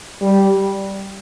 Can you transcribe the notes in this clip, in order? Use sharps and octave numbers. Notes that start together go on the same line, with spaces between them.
G3